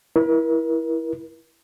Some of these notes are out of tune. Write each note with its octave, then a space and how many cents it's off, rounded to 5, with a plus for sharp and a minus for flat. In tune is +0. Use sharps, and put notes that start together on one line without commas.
E4 +0 A#4 +40